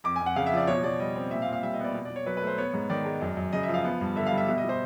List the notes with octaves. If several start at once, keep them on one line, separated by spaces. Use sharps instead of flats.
F2 D6
F2 G#5
F#5
C#3 F5
E5
F3 D5
B2 C#5
B2 D5
G3 D#5
C4
A#2 E5
F5
A#2
F5
G3 E5
D#5
B3
D5
B2
B2 D5
C#5
F#3 B4
A3 B4
C5
B3 C#5
G#2
D#3 D5
G#3
F#2
F#2
C#3 D#5
F3 E5
F5
B3
G2
D3 E5
F5
G3
E5
B2 E5
D#5
B2 C5